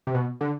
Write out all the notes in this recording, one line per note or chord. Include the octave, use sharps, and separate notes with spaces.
C3
B2
D3